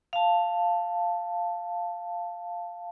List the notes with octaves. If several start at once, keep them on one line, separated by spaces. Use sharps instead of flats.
F5 A5